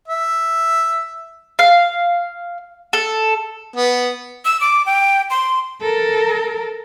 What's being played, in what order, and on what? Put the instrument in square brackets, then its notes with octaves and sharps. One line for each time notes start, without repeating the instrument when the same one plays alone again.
[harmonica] E5
[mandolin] F5
A4
[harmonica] B3
[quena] E6
D6
G5
C6
[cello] A4 A#4